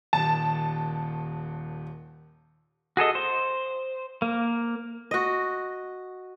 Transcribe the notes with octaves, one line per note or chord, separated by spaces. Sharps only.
D#1 D#2 A5
F#4 G#4 A4 D#5
C5
A#3
F#4 D#5